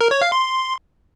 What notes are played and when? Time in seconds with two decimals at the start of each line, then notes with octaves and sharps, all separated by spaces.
0.01 A#4
0.11 C#5
0.22 F5
0.32 C6